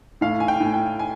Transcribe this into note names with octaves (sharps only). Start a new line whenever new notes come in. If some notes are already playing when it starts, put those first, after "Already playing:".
A2 F5
G#5
G5
A2
G5
G#5